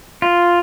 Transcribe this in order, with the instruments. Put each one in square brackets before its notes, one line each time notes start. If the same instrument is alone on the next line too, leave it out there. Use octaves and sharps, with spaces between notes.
[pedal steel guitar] F4